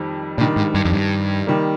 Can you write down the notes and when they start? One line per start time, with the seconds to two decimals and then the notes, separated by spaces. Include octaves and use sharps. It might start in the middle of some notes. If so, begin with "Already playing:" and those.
Already playing: F2 D#3 G3
0.38 A#2 D#3 G3 D4
0.56 G#2
0.75 G2
0.85 F2
0.92 G2
1.47 D#3 G3 A#3